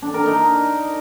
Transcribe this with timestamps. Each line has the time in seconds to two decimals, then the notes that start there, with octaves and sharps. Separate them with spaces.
0.02 D4
0.14 A#4
0.26 D#4